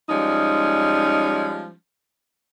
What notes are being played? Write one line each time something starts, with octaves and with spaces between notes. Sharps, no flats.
F3 G3 G#3 C#4 D#4